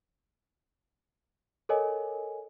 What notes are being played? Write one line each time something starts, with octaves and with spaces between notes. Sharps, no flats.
A4 A#4 C#5 D#5 G#5